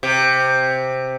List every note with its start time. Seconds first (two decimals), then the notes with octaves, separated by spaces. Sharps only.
0.03 C3